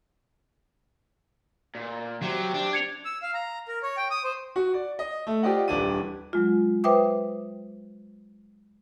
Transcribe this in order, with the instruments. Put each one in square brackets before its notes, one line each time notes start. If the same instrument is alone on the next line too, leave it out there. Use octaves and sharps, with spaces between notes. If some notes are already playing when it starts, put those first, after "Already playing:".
[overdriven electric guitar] A#2
[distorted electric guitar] F#3 [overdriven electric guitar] G4 C5
[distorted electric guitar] D4
[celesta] G#6 C#7 F7
[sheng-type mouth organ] E6
F5
A#5
A#4
C#5
G5
D#6
C5
[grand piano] F#4
D5
D#5
A3
F4 G4 C5 D5 D#5 F#5
D#1 E3 G3 D4 D6 D#7
[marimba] F#3 G#3 F4
B4 C5 E5 G5 D6 D#6